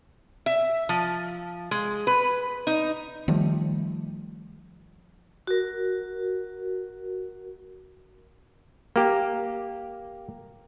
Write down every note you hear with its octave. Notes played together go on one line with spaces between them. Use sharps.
E5
F3
G#3
B4
D#4
D#3 F3 G3 A3
F#4 A#4
A#3 G4